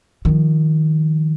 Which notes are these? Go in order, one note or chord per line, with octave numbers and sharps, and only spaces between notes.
D#3 F3